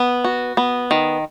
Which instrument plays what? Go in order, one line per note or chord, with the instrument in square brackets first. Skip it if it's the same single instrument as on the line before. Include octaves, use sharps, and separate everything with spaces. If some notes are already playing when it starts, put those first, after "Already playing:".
Already playing: [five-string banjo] B3
F#4
B3
D#3